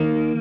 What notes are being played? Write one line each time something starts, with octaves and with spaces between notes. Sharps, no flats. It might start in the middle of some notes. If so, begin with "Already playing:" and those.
Already playing: D#3 A#3